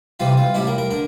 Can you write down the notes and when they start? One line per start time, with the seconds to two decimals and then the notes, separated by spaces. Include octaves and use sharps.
0.20 C2 C3 E3 G3 F4
0.37 F4
0.54 A1 A2 G3 E4
0.67 A#4
0.78 A#4
0.91 D3 A#4